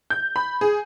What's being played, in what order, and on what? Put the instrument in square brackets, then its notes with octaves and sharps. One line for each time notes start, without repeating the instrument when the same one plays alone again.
[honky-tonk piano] G6
B5
G#4